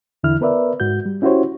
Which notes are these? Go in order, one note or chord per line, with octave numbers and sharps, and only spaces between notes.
E2 D3 E3 E4 F6
B3 A#4 B4 D5 E5
G#2 F#4 G6
G3
C#4 E4 F#4 G4 C5 C#5